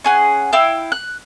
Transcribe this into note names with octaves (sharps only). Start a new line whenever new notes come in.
C#4 G#4 F#5
E4 F5 G5 E6
F#6